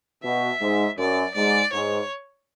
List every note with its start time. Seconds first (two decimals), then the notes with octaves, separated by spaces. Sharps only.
0.23 B2 E5
0.61 G#2
0.98 F#2 D5
1.35 G#2 D5
1.73 G#2 C#5